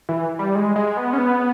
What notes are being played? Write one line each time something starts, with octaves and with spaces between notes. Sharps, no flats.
E3
G3
G#3
G#3
B3
C#4
B3